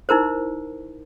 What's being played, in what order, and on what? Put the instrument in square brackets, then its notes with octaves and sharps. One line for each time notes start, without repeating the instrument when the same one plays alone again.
[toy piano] D#4 E4 A#4 C5